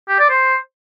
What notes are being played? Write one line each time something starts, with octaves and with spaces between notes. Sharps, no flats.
G4
D5
C5